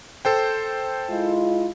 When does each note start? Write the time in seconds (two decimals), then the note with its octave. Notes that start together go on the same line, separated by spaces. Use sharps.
0.25 A4 C5 G5
1.10 G#3 E4 F4